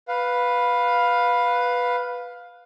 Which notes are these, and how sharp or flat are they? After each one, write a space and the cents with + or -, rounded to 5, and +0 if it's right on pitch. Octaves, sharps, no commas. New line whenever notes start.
B4 +0 F5 +15